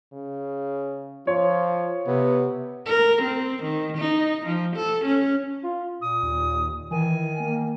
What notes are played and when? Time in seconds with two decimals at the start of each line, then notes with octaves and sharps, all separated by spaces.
0.13 C#3
1.27 F3 F4 C#5
2.07 C3 B3
2.86 A#4
3.22 C4
3.63 D#3
3.98 D#4
4.46 F3
4.76 A4
5.05 C#4
5.64 F4
6.02 A#2 D#6
6.23 D#2
6.91 D#3 E3 G#5
7.40 A#3